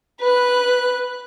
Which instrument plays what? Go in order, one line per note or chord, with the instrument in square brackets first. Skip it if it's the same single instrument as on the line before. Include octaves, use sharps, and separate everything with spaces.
[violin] B4 F#6